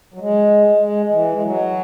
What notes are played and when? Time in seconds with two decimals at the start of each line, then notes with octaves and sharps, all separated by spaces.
0.14 F#3
0.20 G#3
0.80 G#3
1.12 E3
1.31 G#3
1.42 F#3